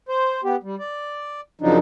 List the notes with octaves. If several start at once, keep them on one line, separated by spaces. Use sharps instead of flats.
C5
B3 G4
G3
D5
F#2 C#3 F3 F#3 D4 D#4